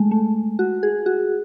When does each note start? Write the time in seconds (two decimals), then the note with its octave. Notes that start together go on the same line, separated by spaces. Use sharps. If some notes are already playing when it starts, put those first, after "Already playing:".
Already playing: G#3 A3
0.11 A3
0.59 F#4
0.83 G#4
1.06 F#4